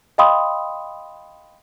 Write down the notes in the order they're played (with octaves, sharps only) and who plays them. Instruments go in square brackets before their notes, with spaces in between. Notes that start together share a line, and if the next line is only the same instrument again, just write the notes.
[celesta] D#5 F5 G5 B5 C6 D#6